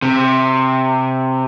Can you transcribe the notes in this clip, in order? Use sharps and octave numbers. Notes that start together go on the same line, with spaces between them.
C3